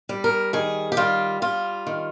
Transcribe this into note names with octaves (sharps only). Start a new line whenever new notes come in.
G3
A#4
D#3 G#4
G4
G3 F4
G3 F4
D#3